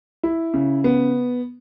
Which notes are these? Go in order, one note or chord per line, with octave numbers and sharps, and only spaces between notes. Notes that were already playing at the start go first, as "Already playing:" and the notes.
E4
C#3
B3